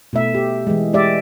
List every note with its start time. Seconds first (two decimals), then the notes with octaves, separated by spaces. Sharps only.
0.13 B2 A3 E5
0.35 G4
0.67 E3 G#3
0.93 G#3 G4 D5 E5